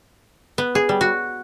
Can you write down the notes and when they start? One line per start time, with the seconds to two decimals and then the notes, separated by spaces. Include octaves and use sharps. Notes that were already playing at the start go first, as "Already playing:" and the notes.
0.58 B3
0.75 G#4
0.89 G3
1.01 F#4